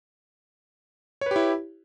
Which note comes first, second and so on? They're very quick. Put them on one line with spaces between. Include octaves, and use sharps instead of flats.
C#5 B4 G4 E4